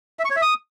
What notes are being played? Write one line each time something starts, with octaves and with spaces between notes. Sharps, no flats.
E5
C#6
C#5
E5
D#6